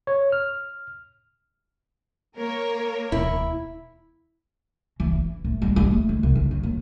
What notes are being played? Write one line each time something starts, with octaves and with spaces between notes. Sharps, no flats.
C#5
F6
A#3 A#4 C#5
D1 E2 B2 E4
E3
E3
A2
G3
G3
A3
D#3
C2
D3
F#3
D#2